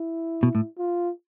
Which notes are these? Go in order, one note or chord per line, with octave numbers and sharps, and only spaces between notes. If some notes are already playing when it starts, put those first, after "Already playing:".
Already playing: E4
B2
A2
F4